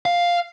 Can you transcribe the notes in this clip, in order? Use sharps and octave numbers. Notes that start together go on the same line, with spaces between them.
F5